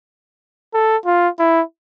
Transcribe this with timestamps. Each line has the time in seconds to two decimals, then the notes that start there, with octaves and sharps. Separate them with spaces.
0.74 A4
1.05 F4
1.39 E4